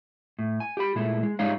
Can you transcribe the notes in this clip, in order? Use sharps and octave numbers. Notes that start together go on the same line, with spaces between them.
A2
G#5
G4 B5
A#2 G#3 A3 E4
G#3
G#2 G3 G#3 D#4 C#5 F5